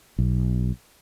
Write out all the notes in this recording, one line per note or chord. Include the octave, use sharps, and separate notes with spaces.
B1